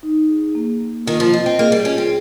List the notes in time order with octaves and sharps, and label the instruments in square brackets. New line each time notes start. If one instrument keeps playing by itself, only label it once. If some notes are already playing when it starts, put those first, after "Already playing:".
[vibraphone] D#4
G#4
A#3
A#3
[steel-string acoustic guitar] D#3 [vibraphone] F4
[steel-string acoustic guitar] F3
[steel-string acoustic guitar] C4 [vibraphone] D#5
[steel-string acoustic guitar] C4
[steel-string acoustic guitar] A#3 [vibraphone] G#4
[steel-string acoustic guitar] G3
[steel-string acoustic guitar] C#4 [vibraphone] F4
[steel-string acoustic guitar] C4